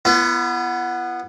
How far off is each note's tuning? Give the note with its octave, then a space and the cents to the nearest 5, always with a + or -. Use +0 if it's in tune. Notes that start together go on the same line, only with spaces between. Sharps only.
B3 -5 E4 +45